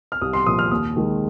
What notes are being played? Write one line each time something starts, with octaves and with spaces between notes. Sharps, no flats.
F6
C2 D#6
C6
A#2 F3 D#6
F6
D#2 D#6
D#3 G#3